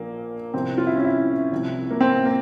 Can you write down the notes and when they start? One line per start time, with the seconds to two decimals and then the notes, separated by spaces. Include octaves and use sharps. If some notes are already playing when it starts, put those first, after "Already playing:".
Already playing: A#1 A#2 F3 A#3
0.54 C2 C3 F3 C4
0.78 F4
0.87 E4
0.96 C#4
1.04 E4
1.52 C2 C3 F3
1.91 A#3
2.01 C4
2.25 A#3